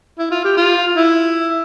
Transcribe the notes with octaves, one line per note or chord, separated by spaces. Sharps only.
E4
F4
G4
F4
E4